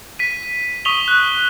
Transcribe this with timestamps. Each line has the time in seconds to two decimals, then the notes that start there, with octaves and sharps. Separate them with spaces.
0.19 B6 D#7
0.85 C#6 D#6 B6 D#7 F7 G7
1.08 F#6